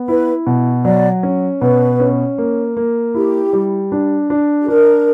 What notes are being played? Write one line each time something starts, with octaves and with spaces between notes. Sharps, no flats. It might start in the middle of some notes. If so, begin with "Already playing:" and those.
Already playing: B3
E4 B4
B2
F#3 D5
C#4
B2 B4
C#4
A#3
A#3
E4 G4
G3
D4
D4
G4
D4 A#4